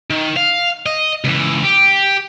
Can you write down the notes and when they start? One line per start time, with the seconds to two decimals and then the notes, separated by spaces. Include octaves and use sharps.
0.10 D#3
0.36 F5
0.86 D#5
1.24 C#2 E3
1.64 G4